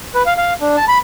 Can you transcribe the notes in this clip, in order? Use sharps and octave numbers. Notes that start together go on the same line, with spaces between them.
B4
F5
F5
D4
A5
B5